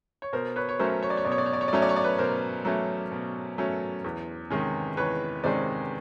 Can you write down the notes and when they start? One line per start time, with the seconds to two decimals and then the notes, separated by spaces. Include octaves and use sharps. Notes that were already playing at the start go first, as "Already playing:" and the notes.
0.22 C#5
0.33 B2 A#4 C5
0.56 B4 C#5
0.69 C#5
0.79 F#3 A3 C#4 A#4 C5
1.03 C#5
1.10 D5
1.17 C#5
1.25 B2 D5
1.32 C#5
1.38 D5
1.46 C#5
1.53 D5
1.61 C#5
1.68 D5
1.73 F#3 A3 C#4 C#5
1.82 D5
1.89 C#5
1.96 D5
2.04 B4 C#5
2.18 B2 A#4 C5
2.65 F#3 A3 C#4
3.12 B2
3.58 F#3 A3 C#4
4.04 E2
4.50 C3 D#3 G#3 C#4
4.97 E2 B4 C#5
5.44 C3 D#3 G#3 C#4 C5 D5